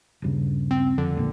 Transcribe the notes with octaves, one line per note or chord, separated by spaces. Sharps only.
D#1 G2 C#3
C4
F2 D3
E1 A#1 A#2